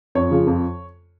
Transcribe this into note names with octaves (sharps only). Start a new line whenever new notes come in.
F2 C#5
C#3 F3
F2